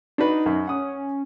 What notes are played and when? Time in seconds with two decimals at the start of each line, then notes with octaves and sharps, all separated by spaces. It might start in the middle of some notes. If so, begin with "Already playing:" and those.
0.18 D4 D#4 F#4 B4
0.46 F#2
0.67 C#4 F#5 D#6